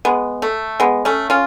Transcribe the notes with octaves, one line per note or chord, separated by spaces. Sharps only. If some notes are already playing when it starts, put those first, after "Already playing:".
G#3 B3
A3
G#3 B3
A3 C#4
C#4 F4